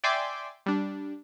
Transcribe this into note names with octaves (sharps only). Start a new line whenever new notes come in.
D5 E5 G5 G#5 C6 D6
G3 D4